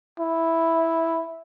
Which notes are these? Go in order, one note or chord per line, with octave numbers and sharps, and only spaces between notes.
E4